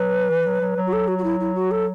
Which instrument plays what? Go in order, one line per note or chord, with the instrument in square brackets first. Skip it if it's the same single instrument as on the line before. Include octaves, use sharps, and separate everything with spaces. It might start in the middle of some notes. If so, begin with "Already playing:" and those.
Already playing: [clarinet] F#3 [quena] B4
[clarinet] E3
F#3
F#3
F#3
[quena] F#4
A4
F#4
F#4
E4
E4
F#4
A4